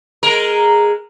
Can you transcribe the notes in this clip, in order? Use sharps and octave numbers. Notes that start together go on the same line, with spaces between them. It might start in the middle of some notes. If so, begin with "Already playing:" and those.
G#3 A#4